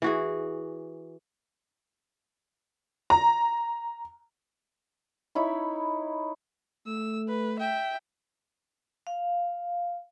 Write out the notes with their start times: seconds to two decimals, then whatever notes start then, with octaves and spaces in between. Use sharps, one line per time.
0.02 E3 F#4 G#4
3.10 A#5
5.35 D#4 E4 C#5 B5
6.87 A3 E6
7.28 B4
7.59 E5 G5
9.07 F5